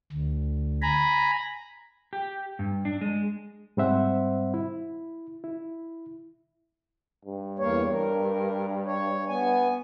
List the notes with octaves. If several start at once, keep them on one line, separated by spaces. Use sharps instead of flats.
D2
G#5 A#5 B5
G4
G2
D4
G#3
G#2 G3 C4 C5 E5 F#5
E4
E4
G2
E2 A#3 C#5
A#4
C#5
B3 G#5